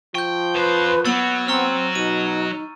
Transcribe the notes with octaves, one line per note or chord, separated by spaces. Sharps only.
F3 G5 C#6 G6
F2 B4 C5
F#3 B3 E6 A6 C#7
C4 A#5 C#6 F6
B2 D#4 D#7